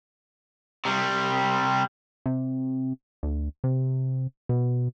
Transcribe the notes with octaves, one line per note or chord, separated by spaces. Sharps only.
C3 G3
C3
D2
C3
B2